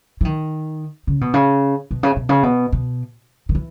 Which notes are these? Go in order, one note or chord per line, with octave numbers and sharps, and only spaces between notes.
E3
D#3
C#3
B2
C#3
B2
C#3
B2
C#3
B2
B2
D#3
E3